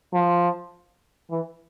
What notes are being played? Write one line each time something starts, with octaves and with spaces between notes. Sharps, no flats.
F3
E3